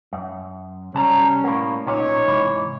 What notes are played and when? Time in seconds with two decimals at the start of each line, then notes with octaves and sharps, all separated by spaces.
0.13 F#2
0.94 C3 G3 C#4 A5 A#5
1.44 A2 A#3
1.86 B1 A#2 C#4 D#4 C#5
2.28 G#2 C3 E3